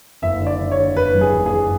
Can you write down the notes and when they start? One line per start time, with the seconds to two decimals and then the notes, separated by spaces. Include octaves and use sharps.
0.22 F#1 E5
0.40 D3
0.47 D5
0.59 D3
0.71 C#5
0.78 D3
0.97 F#1 B4
1.14 F#2
1.21 G#4
1.34 F#1
1.46 G#4
1.53 F#1